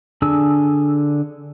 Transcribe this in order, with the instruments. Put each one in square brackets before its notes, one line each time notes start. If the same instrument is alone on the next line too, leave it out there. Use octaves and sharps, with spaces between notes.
[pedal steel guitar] D3 D4 G#4 G#5 E6